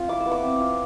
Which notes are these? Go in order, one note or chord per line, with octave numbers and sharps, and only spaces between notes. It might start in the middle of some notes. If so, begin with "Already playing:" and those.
Already playing: C4 F4
E4 D6
E6
B3
D6
C4
F4